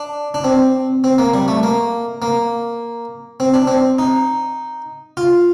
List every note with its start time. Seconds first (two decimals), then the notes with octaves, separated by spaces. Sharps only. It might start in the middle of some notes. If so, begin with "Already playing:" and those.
Already playing: D4
0.34 D4
0.44 C4
1.04 C4
1.18 A#3
1.34 G3
1.48 A3
1.63 A#3
2.22 A#3
3.40 C4
3.54 D4
3.67 C4
3.99 D#4
5.17 F4